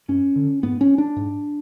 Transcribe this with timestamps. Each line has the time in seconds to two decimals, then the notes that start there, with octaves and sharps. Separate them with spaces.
0.08 F#2 C#4
0.36 D3
0.63 G#2 B3
0.81 C#4
0.98 D4
1.16 G#2